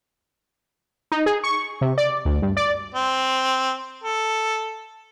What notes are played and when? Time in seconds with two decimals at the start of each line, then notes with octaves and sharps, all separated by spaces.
1.12 D#4
1.26 G#4
1.44 C#6
1.81 C3
1.98 D5
2.25 D2
2.42 G2
2.57 D5
2.94 C4
4.04 A4